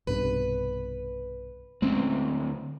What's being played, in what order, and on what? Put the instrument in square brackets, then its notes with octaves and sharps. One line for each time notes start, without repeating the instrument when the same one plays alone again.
[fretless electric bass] B1 G2 C3 [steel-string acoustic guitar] B4
[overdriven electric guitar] D2 C4 [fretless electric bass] G#3 C#4